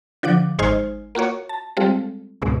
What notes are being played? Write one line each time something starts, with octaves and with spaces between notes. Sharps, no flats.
D3 F3 F#5 D6
G#1 G#3 D#4 C5 G#5 F6
A#3 F4 F#4 C#5
A5
G3 G#3 C4 F4 A4
C#2 G#2 B2 G#3